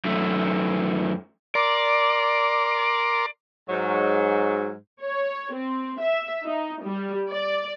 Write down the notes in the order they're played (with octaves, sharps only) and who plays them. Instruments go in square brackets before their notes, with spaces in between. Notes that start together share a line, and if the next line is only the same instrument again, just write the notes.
[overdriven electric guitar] F#2 A3
[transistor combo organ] A#4 C6 D6 [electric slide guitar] D5
[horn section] G#2 F#3
[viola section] C#5
C4
E5
D#4
G3
D5